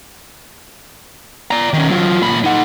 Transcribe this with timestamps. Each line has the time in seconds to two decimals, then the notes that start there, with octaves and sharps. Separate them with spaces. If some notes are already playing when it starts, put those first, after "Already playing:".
1.51 D5 A#5
1.73 D#3 C#4
1.90 F#3 F4
2.21 A#2 B5
2.44 D#4 F#5